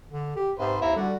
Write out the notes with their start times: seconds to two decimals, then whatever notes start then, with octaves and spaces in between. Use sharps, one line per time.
0.11 D3
0.36 G4
0.59 G#2 C3 B4 C5
0.81 D#2 C4 E4 E5 A#5
0.96 D3 G3 F#4